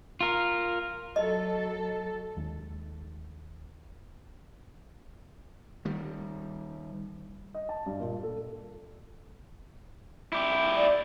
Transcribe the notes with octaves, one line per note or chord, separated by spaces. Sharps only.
F4 A#4
F#3 A4 D#5
D#2 G#3
D#3 G3
D#5
A5
G2
A#2
A4
E4 G4
D5